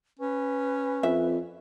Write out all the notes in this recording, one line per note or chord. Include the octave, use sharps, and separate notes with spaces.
C#4 B4
F2 E5